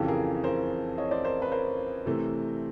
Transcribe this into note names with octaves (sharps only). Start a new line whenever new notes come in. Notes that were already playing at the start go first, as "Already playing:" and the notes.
Already playing: F2 C#3 E3 G4 A4
G#4 A#4
A#4 C5
C#5 D#5
C5 D5
A#4 C5
B4
A#4 C5
C3 E3 A3